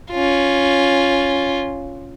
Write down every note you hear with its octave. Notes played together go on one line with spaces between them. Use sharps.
C#4 F4